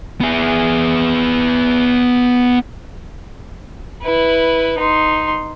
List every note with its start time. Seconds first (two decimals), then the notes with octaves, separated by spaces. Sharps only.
0.21 B3 G#4
4.02 E4 B4
4.78 D#4 C6